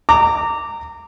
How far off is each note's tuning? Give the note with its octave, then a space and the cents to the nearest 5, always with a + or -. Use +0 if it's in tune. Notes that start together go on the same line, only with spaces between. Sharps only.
A#5 -25 D6 -5